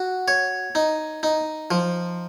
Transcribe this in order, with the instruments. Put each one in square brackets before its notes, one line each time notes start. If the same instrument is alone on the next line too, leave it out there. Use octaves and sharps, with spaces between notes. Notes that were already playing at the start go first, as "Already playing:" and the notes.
Already playing: [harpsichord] F#4
C#5
D#4
D#4
F3